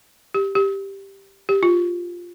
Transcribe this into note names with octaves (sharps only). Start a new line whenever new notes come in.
G4
G4
G4
F4